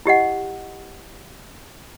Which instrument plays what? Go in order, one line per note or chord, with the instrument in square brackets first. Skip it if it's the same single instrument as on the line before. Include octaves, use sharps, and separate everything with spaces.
[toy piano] E4 G4 D#5 F#5